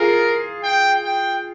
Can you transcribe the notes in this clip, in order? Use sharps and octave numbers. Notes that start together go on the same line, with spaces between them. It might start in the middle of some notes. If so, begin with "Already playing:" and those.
Already playing: F4 G#4 A#4
G5
G5